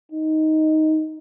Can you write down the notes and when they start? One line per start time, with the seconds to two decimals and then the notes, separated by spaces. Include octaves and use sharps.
0.12 D#4